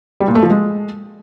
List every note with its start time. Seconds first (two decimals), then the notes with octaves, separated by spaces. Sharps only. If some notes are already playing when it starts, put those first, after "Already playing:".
0.20 G3
0.28 A#2
0.35 A3
0.43 F3
0.50 G#3